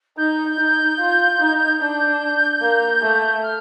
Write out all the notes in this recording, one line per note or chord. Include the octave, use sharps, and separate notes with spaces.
D#4 G6
D#4
F4
D#4
D4 G6
A#3
A3
F6